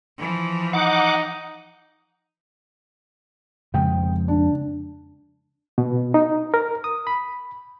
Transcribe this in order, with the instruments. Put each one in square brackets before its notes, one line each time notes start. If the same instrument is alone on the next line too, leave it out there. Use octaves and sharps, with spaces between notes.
[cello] E3 F3
[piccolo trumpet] D#4 [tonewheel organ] F#5 D6
[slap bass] F2 C#3 G#3 [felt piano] G5
[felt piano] D4
[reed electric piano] B2
D#4
A#4
D#6
B5